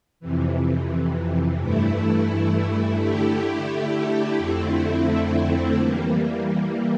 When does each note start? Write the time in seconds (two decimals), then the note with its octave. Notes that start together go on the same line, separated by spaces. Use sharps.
0.20 F2 C3 E3
1.59 G2 E3 A3 E4
2.99 D3 A3 E4 G4
4.38 F2 D3 A3 C4 E4
5.77 E3 G3 A#3